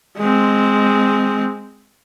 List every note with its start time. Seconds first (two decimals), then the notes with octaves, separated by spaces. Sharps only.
0.18 G#3 C4